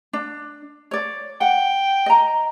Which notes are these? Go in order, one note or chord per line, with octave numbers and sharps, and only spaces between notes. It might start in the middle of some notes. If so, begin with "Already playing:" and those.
D4
C#5 D5
F#5 G5
D#5 A#5